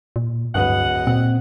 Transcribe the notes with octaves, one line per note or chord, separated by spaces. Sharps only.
A#2
D1 G2 B4 D#5 F#5
A#2 C4